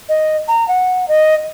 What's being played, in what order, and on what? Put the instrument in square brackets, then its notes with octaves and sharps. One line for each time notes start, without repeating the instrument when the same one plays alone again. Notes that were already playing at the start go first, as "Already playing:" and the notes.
[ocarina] D#5
A#5
F#5
D#5